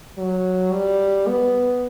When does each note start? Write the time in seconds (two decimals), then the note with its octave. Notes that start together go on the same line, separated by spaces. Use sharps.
0.18 F#3
0.73 G3
1.27 B3